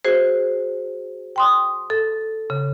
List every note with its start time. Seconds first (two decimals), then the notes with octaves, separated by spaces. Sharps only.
0.05 F#4 G#4 C5
1.36 G5 C6 D#6
1.90 A4
2.50 C#3